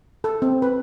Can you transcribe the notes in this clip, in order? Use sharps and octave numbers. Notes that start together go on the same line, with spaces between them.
A4
C4
B4